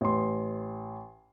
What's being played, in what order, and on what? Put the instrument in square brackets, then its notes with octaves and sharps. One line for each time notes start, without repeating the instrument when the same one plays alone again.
[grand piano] A1 C6